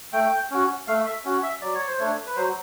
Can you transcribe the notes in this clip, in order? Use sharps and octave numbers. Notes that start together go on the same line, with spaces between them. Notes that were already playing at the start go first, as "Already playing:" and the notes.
A3 G5
C#4 F#4
A3 F5
E5
C#4 F#4
E5
F#3 D5
C#5
C5
A3 D4 C#5
B4
F#3 C5